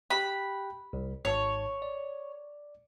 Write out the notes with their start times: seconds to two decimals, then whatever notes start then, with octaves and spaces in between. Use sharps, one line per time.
0.10 G4 G5 B5 F#6
0.93 C2
1.25 G#1 G#2 C#5 A5
1.82 D5